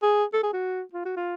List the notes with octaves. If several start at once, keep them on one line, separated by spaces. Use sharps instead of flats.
G#4
A4
G#4
F#4
F4
F#4
F4